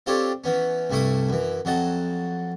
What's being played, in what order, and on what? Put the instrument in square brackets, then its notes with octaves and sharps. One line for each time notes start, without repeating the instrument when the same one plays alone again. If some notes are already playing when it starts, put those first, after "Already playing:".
[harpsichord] C4 D4 F4 G4 A4 C#5
E3 B3 C#4
C2 G2 A3 E4 C#6 D#6
F#2 E3
F2 F#3 F#4 D#5 A5